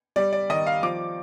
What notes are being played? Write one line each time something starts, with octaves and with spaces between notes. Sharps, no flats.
G3 D5
D5
D#3 D#5
F5
F3 D6